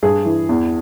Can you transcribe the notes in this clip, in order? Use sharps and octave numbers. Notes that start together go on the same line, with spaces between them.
G2 G#4
E3
E2